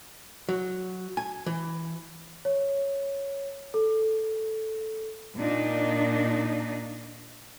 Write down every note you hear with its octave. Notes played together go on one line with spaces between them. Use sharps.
F#3
G#5
E3
C#5
A4
A#2 D4 D#4